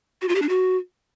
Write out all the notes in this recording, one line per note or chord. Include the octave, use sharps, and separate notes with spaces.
F#4
F4
G4
D4
F#4